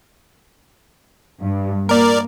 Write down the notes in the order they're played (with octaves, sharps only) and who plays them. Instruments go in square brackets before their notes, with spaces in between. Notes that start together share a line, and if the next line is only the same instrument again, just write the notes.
[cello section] G2
[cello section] A#3 [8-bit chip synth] A#4 D5